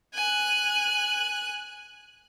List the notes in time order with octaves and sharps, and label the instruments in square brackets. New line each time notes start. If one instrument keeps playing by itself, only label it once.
[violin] G#5 F#6